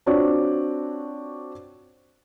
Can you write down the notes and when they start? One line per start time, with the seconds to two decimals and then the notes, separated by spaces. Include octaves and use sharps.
0.06 C4 D4 F4 F#4 C#5 D5